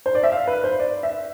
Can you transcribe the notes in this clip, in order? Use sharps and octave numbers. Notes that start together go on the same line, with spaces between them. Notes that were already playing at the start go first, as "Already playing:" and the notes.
C5
D5
E5
F5
B4
C5
D5
E5